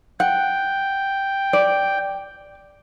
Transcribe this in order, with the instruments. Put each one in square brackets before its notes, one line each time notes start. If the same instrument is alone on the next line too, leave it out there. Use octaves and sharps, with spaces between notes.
[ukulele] F#5 [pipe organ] G5
[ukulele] D5